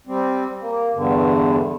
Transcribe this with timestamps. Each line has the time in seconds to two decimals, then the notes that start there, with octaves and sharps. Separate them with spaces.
0.07 G3 C4
0.61 A#3
0.94 E2 G2 D3